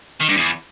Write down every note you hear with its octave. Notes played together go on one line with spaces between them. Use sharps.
D#3
G2
E2